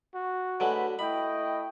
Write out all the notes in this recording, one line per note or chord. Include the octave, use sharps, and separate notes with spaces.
F#4
D3 F#3 G#3 A3 B4
A3 E4 D#5 G5 B5